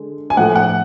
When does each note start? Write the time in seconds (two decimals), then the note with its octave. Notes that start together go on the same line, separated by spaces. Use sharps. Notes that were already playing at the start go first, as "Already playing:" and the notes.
Already playing: D3 G#3
0.30 G#5
0.37 A2 F3 A3 F#5
0.56 F#5